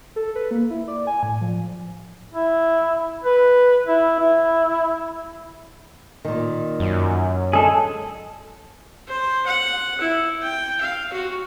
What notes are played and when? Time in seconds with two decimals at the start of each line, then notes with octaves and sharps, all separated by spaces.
0.16 A4
0.35 B4
0.51 A#3
0.70 E4
0.88 D5
1.07 G#5
1.23 A2
1.41 F3
2.33 E4
3.23 B4
3.87 E4
4.20 E4
6.25 A#2 D#3
6.80 F#2
7.53 D3 G#3 G#4 A4
9.08 C5
9.46 F#5
10.01 E4
10.42 G5
10.81 F5
11.13 F#4